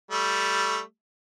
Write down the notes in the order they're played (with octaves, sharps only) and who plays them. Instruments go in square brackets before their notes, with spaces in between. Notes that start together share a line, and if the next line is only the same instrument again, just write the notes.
[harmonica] G3 A3